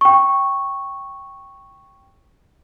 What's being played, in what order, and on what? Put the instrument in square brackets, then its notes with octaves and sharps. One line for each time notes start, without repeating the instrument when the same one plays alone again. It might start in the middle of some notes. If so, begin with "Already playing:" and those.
[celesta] G5 C#6